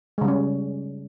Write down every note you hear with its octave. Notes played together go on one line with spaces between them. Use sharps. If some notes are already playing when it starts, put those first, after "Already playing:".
C#3 G3 G#3 C#4